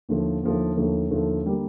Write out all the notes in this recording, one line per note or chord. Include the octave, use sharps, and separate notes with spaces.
D#2 D3 F3 A3
D#2 D3 F3 A3
D#2 D3 F3 A3
D#2 D3 F3 A3
D3 G3 A#3